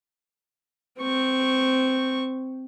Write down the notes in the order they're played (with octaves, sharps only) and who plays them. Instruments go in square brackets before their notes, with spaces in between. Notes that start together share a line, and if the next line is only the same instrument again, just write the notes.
[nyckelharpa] C4 C#6